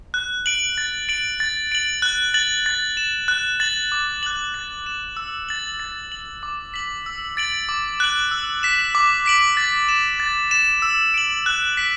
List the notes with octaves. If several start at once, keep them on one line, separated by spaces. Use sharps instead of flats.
F#6
D7 F#7
A6
D7 F#7
A6
D7 F#7
F#6
A6 F#7
A6
E7
F#6
A6 F#7
D6
F#6 A6 F#7
A6
E7
E6
A6 F#7
A6
F#7
D6
B6 F#7
E6
A6 D7 F#7
D6
F#6 D7 F#7
E6
B6 E7
D6
B6 D7 F#7
A6
E7
A6
E7
E6
D7 F#7
F#6
B6 D7